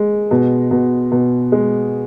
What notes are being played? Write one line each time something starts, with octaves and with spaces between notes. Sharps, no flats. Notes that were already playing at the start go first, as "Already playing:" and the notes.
Already playing: G#3
B2
B2
B2
G#3